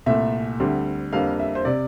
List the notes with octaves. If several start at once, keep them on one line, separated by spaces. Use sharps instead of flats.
C2 A#2 A3 E5
D2 D3 G3 C4
F2 D3 G3 A#3 F5
E5
C5
C3 D5